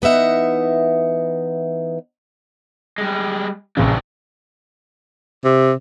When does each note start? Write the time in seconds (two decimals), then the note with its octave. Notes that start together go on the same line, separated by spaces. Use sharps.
0.02 E3 B3 D#4 E5 F#5
2.98 G3 G#3
3.77 A#1 C#3 E3 D4 G4
5.44 C3